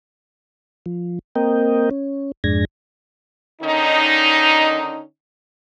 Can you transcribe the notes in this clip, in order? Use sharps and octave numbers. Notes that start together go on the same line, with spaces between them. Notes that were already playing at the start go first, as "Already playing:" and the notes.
F3
A#3 C4 A#4 D#5 G5
C#4
F2 G#2 G#3 D4 G#6 A#6
D3 D#3 C#4 D#4